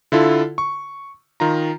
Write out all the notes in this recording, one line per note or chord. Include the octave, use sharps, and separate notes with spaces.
D3 E4 F4 A4
C#6
D#3 F4 A#5